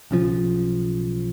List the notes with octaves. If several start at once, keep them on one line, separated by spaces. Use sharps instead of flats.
B1 C#3 F3